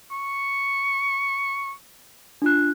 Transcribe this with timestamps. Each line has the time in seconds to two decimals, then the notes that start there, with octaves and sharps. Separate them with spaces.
0.11 C#6
2.42 D4 F4 F#6